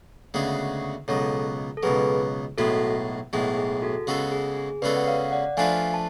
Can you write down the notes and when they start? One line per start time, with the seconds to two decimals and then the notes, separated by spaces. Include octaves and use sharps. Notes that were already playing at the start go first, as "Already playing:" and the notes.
0.34 D2 C#3 G#3 B3 F#4
1.08 C#2 B2 F#3 A4 C#5
1.77 A4
1.83 C#2 B2 F#3 G#4 B4
2.58 B1 A2 G#3 B3 F#4 A4
3.33 B1 A2 G#3 B3 G#4
3.57 G#4
3.82 F#4 A4
4.07 C#3 G#3 B3 F#4 A4
4.32 G#4
4.57 G#4
4.82 C#3 G#3 B3 F#4 A4 B4 D5
4.96 F#5
5.08 C#5 F5
5.32 D5 F#5
5.57 F3 A3 D4 F4 B4 F5 G#5
5.94 A5